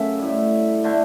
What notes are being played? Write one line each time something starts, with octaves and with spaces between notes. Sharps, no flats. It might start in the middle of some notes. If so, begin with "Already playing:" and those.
Already playing: F#2 C#3 F#3 A3 E5
A2 G3
D3 A3